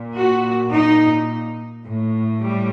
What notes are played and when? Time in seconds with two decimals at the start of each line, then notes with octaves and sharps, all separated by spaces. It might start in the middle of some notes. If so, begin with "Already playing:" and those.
Already playing: A#2
0.16 F#4
0.72 D#4
1.84 A2
2.39 G3